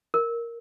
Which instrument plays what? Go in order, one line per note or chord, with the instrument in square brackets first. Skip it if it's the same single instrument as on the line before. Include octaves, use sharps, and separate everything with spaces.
[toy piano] A#4